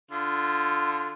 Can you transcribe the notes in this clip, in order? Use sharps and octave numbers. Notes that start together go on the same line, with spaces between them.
D3 F4